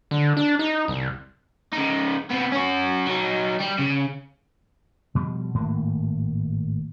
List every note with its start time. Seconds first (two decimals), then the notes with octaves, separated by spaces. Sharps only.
0.11 D3
0.37 D4
0.59 D#4
0.88 C2
1.72 C#3 D#4
2.30 C3 B3
2.52 C#4 F#4
3.07 F#3 D#4
3.60 G3
3.79 C#3
5.15 B2 F3 G3
5.54 G#1 A2 A#3